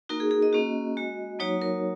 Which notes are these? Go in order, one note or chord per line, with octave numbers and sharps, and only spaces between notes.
A#3 D#4 F#4 A#4
G#4
G#4
D#5
A#3 C#4 F#4
G#3 F#4
F#3 A#3 D#4 F#4 C#5
A#4